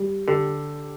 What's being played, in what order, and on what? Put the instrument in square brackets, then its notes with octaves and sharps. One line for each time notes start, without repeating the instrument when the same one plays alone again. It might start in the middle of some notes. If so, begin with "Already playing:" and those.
Already playing: [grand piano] G3
[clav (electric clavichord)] D3 [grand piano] G4